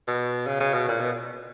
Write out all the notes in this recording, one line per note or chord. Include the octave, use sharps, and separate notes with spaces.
B2
C#3
C#3
B2
A#2
B2